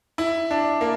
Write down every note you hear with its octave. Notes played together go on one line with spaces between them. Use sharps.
E4
D4
A#3